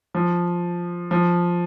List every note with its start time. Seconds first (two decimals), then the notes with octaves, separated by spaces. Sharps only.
0.14 F3
1.11 F3